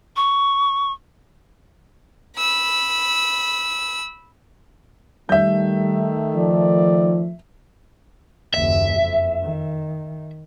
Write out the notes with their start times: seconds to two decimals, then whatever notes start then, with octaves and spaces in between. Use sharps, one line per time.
0.16 C#6
2.37 B5 E6
5.29 D#3 G3 A3 E5 G6
6.35 F3 D5
8.54 F#1 D#2 E5
8.97 F#1 F2
9.43 D#3